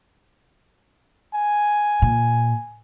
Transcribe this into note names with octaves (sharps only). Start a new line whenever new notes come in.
G#5
A#2